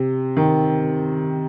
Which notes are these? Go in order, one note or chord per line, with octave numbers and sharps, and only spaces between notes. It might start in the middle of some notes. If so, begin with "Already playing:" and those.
Already playing: C3
D#3